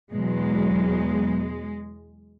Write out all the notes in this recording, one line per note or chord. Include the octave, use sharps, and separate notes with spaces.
E2 B2 F#3 G#3